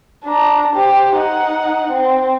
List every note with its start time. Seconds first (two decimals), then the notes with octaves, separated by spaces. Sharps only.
0.25 D4 A#5
0.75 G4 C5
1.16 D#4 F#5
1.91 C4